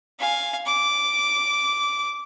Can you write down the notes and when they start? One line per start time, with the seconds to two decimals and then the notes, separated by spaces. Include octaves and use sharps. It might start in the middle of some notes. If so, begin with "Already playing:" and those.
0.19 F5 G#5
0.66 D6